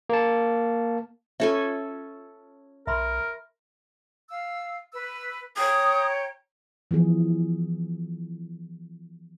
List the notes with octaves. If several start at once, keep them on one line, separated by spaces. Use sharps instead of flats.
A#3 A5
C#4 F4 A4 E5 G#5
B1 A#4 E5 B5 C6
F5 E6
B4 E6
C#5 G5 A#5 D#6
E3 F3 B3 G#4